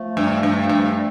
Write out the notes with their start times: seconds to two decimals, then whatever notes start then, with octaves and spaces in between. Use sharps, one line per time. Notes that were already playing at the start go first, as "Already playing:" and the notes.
Already playing: F3 A3
0.17 G2
0.43 G2
0.69 G2